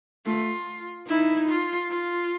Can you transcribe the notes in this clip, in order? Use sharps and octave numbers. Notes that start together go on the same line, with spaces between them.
A3 F4
D#4 E4
F4
F4